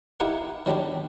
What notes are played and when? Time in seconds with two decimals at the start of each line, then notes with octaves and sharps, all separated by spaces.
0.20 D#4 E4 G4 A#4 F5 F#5
0.66 D#3 F#3 G3 D4 G4